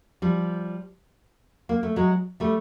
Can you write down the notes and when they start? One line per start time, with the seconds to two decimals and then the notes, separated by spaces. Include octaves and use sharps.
0.22 F3 G3
1.69 A#3
1.83 A3
1.96 F#3 G#3
2.40 G3 A3